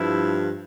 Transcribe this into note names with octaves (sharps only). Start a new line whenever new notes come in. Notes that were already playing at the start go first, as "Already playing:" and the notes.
Already playing: G2 F3 E4